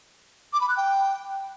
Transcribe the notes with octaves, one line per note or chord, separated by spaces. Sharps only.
D6
B5
F#6
G5